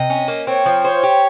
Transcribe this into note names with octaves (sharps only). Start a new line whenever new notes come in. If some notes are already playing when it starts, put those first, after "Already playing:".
Already playing: C3 D#5
C#4
A#3
C4 C#5
F3
C5 C#5
G4